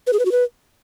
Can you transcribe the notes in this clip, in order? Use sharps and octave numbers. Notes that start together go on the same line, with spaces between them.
B4
G#4
B4
F#4
B4